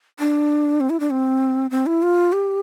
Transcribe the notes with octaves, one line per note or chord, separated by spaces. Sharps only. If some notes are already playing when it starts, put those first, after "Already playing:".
D4
C4
E4
D4
C4
C4
E4
F4
G4